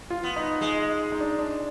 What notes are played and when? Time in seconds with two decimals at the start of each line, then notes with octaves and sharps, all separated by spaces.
0.10 F4
0.23 B3
0.36 D#4
0.61 G#3
1.12 D#4
1.20 D4
1.39 D4